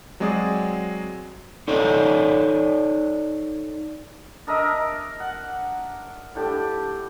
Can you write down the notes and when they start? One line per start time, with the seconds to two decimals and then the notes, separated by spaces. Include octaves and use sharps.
0.20 F#3 G#3 C4 G#4 D5 D#6
1.68 D#4 A4 C#5 D5
4.47 D4 A#4 D#5 E5
5.20 F#5
6.35 A2 D4 G4